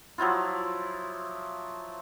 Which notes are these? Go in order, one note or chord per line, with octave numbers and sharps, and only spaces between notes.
F3 F#3 E4 F4